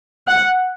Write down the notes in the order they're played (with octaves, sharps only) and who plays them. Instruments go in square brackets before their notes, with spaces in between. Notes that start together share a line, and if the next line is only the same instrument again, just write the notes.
[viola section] F#5